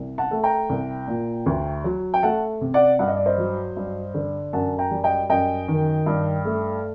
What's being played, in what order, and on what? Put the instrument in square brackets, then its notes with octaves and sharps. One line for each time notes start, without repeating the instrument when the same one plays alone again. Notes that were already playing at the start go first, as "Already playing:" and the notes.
Already playing: [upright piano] C2
F#5 A5
A3
G5 A#5
C2
A#2
D2
F#3
G5
A3 F#5 A5
C3
D5 F#5
G2 F#5
D#5
D5
C5 D#5
F#3
G2
D3
F#2 F#5 A5
G5 A#5
G3
D#5 G5
F#2 D#5 G5
D#3
G2
A3